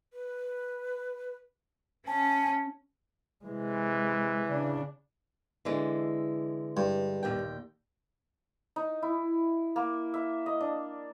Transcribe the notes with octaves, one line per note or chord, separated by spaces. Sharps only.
B4
C#4 G#5 A5
C3 E3 G#3
C#3 D4
D3 E3 G#3
G2
D#2 A#2 G5
D#4
E4
A#3
E5
D#5
D4